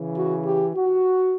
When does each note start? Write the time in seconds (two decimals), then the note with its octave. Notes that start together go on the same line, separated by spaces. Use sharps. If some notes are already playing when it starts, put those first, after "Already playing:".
Already playing: C#3 E3
0.14 F#4
0.44 G4
0.75 F#4